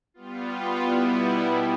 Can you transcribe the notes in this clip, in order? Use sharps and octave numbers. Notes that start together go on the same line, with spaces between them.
G3 B3 F4
B2 G3 B3 E4
G3